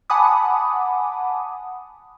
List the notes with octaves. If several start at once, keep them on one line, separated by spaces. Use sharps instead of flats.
F#5 G#5 A5 B5 D6 D#6